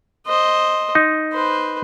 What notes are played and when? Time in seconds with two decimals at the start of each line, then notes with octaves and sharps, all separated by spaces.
0.26 C5 D#5
0.95 D#4
1.33 B4 C5